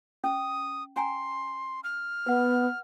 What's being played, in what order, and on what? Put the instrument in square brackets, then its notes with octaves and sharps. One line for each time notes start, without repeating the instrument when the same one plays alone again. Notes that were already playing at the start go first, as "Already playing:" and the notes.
[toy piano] C#4 [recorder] D#6
[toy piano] C#4 G#5 A#5 [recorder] C6
[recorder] F6
[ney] B3 [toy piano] B4 F#5